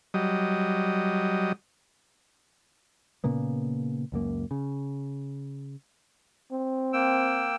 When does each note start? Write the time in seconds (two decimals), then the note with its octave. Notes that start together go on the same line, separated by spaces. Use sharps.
0.14 F#3 G3 D#5
3.24 A#2 C#3 A#3 B3
4.12 C#2 F#2 A#3
4.51 C#3
6.52 C4
6.93 A#3 G5 E6